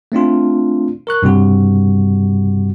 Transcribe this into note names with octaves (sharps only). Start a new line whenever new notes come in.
A3 C4 D4 F4
A#4 C#6 F#6
G2 C3 G3 F#4